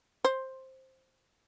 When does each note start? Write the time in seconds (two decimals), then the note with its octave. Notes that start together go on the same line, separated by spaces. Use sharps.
0.25 C5